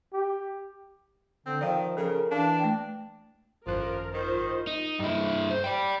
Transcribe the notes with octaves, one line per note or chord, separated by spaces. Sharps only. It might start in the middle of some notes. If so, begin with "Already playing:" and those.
G4
D3 C4
D#3 F3 D5 F5 G5
C#3 A4 A#4
E3 D4 F5
A3 G5
G#1 F#2 F3 A#4 F#6
D#3 F4 C5
D#4
G2 E4
C5
D5 G5